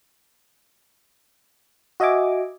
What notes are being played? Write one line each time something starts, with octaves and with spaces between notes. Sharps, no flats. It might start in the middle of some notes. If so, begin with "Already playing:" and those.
F#4 D#5 E5 G#5 D6